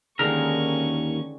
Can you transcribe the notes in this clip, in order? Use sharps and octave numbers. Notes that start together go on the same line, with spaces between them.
D#2 D3 D#3 G#3 C#4 A#4 C#6